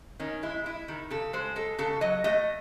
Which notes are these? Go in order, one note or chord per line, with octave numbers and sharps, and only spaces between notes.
D#3 C#4
G#3 E4
G#3 E4
D#3
C#3 A4
G#3 C5
G#3 A4
C#3 A4
F#3 D#5
A3 D#5